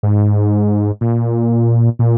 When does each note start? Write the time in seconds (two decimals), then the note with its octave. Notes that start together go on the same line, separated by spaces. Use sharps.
0.03 G#2
1.01 A#2
1.99 A#2